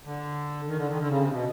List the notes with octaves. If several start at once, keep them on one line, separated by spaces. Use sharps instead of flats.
D3
D#3
D3
D#3
D3
C#3
C3
B2